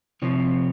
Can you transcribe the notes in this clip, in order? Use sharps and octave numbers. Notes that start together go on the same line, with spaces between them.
C3 F3 C4 C#5